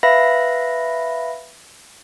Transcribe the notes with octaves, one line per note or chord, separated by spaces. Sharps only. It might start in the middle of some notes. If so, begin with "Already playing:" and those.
B4 E5 F5 B5 A#6